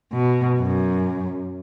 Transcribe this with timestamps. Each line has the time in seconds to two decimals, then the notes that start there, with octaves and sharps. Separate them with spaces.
0.13 B2
0.59 F#2